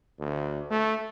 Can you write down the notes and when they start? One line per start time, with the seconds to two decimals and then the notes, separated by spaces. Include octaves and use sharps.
0.19 D2
0.71 A3